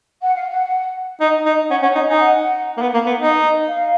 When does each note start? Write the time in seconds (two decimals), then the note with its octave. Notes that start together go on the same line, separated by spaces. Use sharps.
0.22 F#5
0.36 F5
0.49 F#5
1.21 D#4
1.46 D#4
1.70 C#4 F#5
1.83 C#4 F#5
1.95 D#4 G#5
2.07 D#4 G#5
2.20 F#5
2.77 A#3
2.82 B3
2.94 A#3
3.06 B3
3.19 D#4
3.68 F5